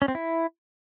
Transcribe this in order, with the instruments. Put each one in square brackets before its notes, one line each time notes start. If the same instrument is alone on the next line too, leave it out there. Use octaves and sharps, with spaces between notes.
[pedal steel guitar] C#4
C4
E4